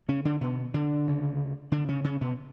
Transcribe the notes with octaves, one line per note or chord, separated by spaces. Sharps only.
C#3 C#4
D3 D4
B2 B3
D3 D4
D2 C#3
D3 D4
C#3 C#4
C#3 C#4
B2 B3